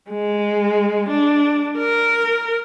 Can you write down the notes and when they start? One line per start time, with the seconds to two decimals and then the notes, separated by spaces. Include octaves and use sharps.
0.11 G#3
1.09 D4
1.78 A#4